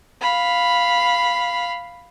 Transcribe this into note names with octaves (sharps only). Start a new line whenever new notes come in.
F5 B5